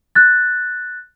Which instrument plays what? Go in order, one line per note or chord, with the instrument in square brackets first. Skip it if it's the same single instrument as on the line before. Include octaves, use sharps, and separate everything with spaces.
[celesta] F#6 A6